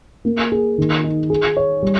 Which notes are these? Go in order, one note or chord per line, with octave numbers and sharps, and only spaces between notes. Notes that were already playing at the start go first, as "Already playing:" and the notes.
A#3
G#4
D#3
D#4
G#4
C#5
G3